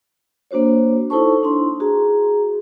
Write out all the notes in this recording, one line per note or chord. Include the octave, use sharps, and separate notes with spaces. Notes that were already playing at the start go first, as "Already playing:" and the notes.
A#3 D4 F#4 C5 C#5
D#4 E4 A4 C5 A5 C#6
D4 E4 C6
F#4 G#4 A#5